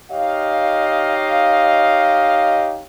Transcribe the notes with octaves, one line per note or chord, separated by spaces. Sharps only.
D#4 G4 C#5 D#5 F5